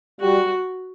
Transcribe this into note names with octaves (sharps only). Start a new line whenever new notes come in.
G3 F#4